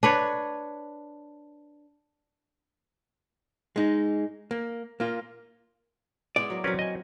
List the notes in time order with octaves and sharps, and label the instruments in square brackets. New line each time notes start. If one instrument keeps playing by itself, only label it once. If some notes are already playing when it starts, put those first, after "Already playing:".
[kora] D4 B4 C#5
[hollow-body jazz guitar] G#3 D#4
A#3
A#3 F4
[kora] G#3 B3 E4 [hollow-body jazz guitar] D5
[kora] F#3 A#3
[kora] F#3 C4 [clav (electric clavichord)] C#4 A#4 B4
[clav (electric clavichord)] D#5 G#5